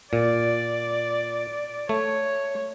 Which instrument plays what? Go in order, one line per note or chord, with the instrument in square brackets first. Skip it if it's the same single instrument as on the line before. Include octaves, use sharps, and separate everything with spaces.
[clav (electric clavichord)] A#2 [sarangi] D5
[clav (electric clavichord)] A3 [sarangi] C#5